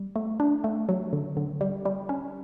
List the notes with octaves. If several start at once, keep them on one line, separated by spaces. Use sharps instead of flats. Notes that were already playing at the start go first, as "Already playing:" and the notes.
Already playing: G3
A3
D4
A3
F#3
D3
D3
G3
G3
C#4